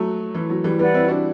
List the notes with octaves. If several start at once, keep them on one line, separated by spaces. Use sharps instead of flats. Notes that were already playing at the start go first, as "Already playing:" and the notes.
Already playing: F#3 A3
E3
F#3
E3 G3
E3 G3 B4 D5 F#5
C4 E4
E4
D4 F#4